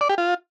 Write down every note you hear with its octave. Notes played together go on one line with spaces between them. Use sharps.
D5
G4
F4